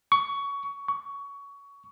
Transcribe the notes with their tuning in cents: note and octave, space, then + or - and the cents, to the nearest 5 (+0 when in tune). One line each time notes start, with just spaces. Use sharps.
C#6 +20
C#6 +20